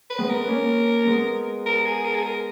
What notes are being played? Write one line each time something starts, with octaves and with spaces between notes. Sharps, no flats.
B4
G#3 B3
A#4
B3
A#3 C#4
G#3 B3
A#4
G#4
A#4
G#4
A#4